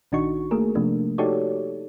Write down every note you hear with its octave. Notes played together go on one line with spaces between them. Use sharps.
A#1 D#3 D4 D#4 F#4 C#6
A3 A#3 G#4 A#4
C3 F3 A3 A#3 D4
D#4 F#4 G4 A4 C#5 D5